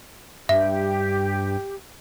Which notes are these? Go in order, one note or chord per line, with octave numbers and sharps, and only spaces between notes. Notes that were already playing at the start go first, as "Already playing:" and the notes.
G2 G4 E5